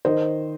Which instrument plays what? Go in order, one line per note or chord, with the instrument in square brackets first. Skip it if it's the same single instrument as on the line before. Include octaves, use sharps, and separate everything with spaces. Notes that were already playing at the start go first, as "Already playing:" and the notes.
[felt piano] D#3 C5 D#5